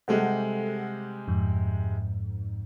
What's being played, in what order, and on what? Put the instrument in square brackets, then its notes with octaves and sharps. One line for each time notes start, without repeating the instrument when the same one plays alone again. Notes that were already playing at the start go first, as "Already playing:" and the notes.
[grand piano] C3 G3 G#3 [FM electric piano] G#4 A4 F#5
[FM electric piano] F2 G#2